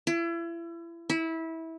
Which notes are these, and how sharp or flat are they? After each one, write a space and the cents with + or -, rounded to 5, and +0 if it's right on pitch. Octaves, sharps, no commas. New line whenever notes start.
E4 +35
E4 -20